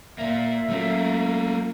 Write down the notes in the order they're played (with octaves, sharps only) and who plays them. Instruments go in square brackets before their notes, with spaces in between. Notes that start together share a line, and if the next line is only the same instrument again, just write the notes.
[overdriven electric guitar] A#2 A#3 [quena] E5
[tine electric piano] F#3 C#4 F4 [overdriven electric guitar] A3 A#3